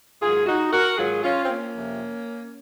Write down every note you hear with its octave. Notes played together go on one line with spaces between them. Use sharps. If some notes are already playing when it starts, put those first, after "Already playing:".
G#2 D#3 F#3 F4 G#4
D#4 F#4
F#4 A#4
G#2 D#3 F#3 F4 G#4
C#4 F4
C4
A#3 C#4
F2 C3 F3